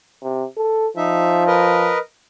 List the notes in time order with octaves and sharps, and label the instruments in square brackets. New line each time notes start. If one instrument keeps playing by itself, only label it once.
[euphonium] C3
A4
[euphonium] F3 [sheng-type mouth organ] D#4 E5
[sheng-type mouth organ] A#4 B4 D#5